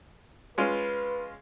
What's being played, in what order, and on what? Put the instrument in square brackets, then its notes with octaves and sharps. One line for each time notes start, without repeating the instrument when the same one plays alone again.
[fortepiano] G#3 C#4 F4 [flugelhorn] B4